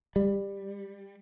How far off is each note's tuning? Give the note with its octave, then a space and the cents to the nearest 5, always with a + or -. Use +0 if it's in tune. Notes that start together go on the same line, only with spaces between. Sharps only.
G3 +15